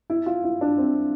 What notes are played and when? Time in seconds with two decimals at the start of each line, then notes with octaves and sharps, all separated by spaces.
0.10 E4
0.26 F4
0.44 E4
0.61 D4
0.78 C4